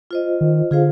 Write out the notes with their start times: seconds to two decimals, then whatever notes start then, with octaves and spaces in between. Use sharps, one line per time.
0.11 F4 C5 D#5
0.41 D#3
0.71 D3 F4 G#4 C5 F5